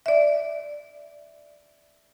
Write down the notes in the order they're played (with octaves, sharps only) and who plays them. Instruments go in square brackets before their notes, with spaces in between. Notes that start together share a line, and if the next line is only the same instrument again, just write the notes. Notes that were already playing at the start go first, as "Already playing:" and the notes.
[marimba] D5 E5